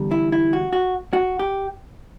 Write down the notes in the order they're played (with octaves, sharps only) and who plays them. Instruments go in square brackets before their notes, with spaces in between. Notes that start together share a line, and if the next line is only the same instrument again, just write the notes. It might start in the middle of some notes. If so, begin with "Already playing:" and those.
Already playing: [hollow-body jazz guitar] E2 D3 G3
E4
E4
F#4
F#4
F#4
G4